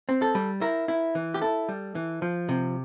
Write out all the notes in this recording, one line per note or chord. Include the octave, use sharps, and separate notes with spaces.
C4
A4
G3
E4 A#4
E4
E3
G4
E4 A4
G3
E3
F3
C3